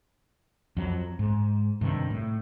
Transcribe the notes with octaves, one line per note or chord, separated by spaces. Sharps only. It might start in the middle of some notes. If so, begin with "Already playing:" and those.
F2 F#3
G#2
G2 C3 D#3
A2